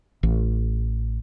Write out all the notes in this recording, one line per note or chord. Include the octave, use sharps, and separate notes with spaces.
A1